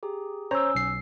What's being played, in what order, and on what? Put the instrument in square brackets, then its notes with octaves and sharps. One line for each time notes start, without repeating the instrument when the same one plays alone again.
[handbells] G4 G#4 A#5
[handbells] C#4 G#5 E6 [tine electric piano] C5 C#5 A#5
[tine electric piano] B1 C7